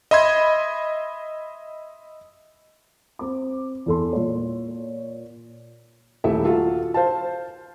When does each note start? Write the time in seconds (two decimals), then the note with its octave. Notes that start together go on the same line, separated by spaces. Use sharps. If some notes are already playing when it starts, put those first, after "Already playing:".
0.11 D#5 E5 B5 C6 G#6
3.19 C4 D6
3.86 E2 A4 C6
4.13 A#2 C#5
6.24 D#1 A3 E4 E5
6.45 F4 F#4 A4
6.94 C5 F5 A5